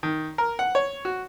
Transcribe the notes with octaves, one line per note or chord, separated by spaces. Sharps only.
D#3
A#4
F#5
C#5
F#4